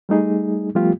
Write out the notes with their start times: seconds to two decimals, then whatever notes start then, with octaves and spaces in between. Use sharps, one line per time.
0.09 G3 A3 D#4 G#4
0.75 F3 G3 A3 B3 F4 G4